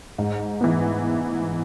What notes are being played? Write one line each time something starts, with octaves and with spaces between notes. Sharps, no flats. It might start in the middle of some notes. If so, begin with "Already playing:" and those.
G#2
E3 B3